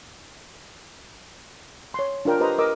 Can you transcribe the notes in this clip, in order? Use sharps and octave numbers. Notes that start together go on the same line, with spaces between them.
C#5 C6
D4 F4 A#4 G5
G4 B4 C5 D#5 A#5
A#4 D#5 D6 E6